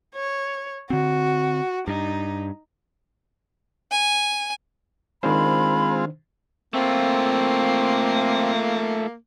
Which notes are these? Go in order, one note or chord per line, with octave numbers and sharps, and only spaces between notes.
C#5
D3 C4 F#4
G2 D#4
G#5
D#3 G#3 C4 D4 F4 C5 B5
A3 A#3 C4 F4